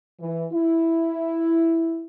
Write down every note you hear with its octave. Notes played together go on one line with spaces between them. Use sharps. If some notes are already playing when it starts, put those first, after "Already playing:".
E3
E4